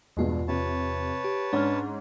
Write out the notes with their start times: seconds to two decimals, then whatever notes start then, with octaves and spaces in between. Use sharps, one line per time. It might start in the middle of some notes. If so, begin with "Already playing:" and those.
0.17 E2 G2 B2 G#3 F4
0.48 C3 B4 C#5 A5
1.24 G4
1.53 G#2 C#4 D4 F6